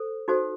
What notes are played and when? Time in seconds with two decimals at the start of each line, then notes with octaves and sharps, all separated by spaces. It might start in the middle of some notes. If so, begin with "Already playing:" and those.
Already playing: A4 C5
0.28 D#4 F#4 A4 C5